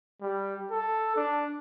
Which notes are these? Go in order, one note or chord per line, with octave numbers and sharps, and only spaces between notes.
G3
A4
D4